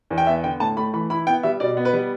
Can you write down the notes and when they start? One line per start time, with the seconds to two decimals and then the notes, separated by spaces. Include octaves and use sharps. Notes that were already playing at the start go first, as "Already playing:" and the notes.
0.10 E2
0.18 G5
0.27 B3 E5
0.44 D3 G5
0.60 A2 A5
0.77 A3 B5
0.93 E3 B5
1.10 E4 B5
1.27 B3 G5
1.43 G3 E5
1.60 B2 D5
1.77 B3
1.85 B4
1.93 G3